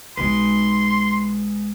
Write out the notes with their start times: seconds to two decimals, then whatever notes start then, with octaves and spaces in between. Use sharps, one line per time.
0.17 B1 G#3 D#4 B4 C6